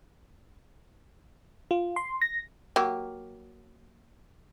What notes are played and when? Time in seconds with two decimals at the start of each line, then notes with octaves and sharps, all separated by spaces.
1.71 F4
1.96 C6
2.22 A#6
2.76 F#3 A#3 G4